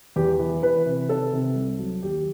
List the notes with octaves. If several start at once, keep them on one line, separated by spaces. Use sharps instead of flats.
E2 G4
E3
E3 B4
C3
D#3 A4
C3
C2
F#3
D#2 G4